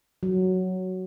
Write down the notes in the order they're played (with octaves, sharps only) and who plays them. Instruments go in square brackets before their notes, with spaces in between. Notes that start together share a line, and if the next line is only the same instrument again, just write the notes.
[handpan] F#3